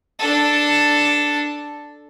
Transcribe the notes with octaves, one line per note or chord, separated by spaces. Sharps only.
D4 A4